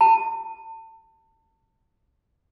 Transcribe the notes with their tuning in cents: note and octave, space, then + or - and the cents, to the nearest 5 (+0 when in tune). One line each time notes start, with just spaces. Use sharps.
A5 +30